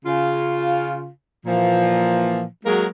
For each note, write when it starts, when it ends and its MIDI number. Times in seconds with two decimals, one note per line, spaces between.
0.05 1.09 49
0.05 1.09 65
1.45 2.45 46
1.45 2.45 52
1.45 2.45 53
2.65 2.86 54
2.65 2.86 56
2.65 2.86 58
2.65 2.86 66
2.65 2.86 68
2.65 2.86 70